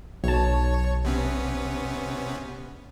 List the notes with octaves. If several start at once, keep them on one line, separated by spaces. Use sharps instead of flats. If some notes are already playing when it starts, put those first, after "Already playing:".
B1 C#5 A5
C3 B3 C#4